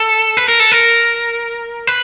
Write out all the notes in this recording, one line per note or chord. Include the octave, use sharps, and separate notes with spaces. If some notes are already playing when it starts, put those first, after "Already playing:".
Already playing: A4
B4
A#4
A4
A#4
B4